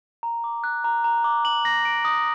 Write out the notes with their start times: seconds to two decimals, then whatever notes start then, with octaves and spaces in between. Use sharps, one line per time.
0.23 A#5
0.44 D6
0.64 F#6
0.84 A#5
1.04 A#5
1.24 D6
1.45 F#7
1.65 A#6
1.85 D7
2.05 D#6